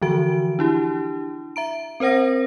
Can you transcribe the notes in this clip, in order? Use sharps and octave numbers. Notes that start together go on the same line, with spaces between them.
D3 E3 F3 F#4 D7
D4 E4 G4
E5 A#5 D7
C4 A#4 C5 F#5 A#6